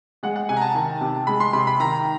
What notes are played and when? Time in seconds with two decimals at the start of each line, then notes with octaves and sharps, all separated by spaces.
0.23 G#3 F#5
0.36 F#5
0.49 C3 G#5
0.57 A#5
0.61 A5
0.75 D#3 A5
1.01 C3
1.27 G#3 B5
1.40 C6
1.53 C3 B5
1.67 B5
1.80 D#3 A#5